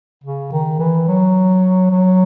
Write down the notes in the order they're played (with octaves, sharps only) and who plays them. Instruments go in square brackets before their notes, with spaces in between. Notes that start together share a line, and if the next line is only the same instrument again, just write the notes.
[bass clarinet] C#3
D#3
E3
F#3
F#3